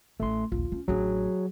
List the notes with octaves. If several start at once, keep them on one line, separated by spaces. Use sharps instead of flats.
A1 A3 E4 C6
A#1 D#2 F4
C#4
A1 F#3 D4 G#4